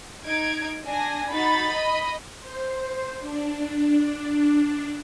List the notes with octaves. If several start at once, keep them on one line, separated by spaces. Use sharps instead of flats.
D#4 G#6 D7
D4 G#5 A#6
D#4 F#4 B5 A6
D#5
C5
D4